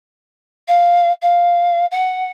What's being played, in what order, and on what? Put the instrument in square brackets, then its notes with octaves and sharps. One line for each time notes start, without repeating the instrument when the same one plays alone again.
[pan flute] F5
F5
F#5